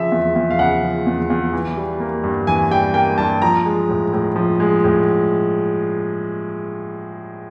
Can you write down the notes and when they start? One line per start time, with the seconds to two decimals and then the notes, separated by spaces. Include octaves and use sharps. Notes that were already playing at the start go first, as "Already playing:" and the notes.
Already playing: C#3 F3 E5
0.12 E2
0.36 E2
0.51 F5
0.59 C#3 F#5
0.82 F3
1.06 E2
1.30 E2
1.53 E3
1.77 G3
2.00 A#3
2.24 G2
2.47 E3 G#5
2.71 G3 G5
2.94 A#3 G5
3.18 G2 A5
3.42 F3 A#5
3.65 G#3
3.89 A2
4.13 A2
4.36 F3
4.60 G#3
4.84 A2